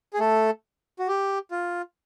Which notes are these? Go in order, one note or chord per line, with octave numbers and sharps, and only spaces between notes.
G#4
A3 A4
F#4
G4
F4